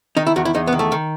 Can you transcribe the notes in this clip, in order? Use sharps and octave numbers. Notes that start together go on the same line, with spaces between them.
D#3 D#4
E4
E2 F#4
E4
E2 D#4
B3
D#3
A3
D#3